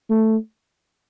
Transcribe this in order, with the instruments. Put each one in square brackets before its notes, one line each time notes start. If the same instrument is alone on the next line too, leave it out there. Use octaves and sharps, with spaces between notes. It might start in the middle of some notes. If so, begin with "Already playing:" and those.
[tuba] A3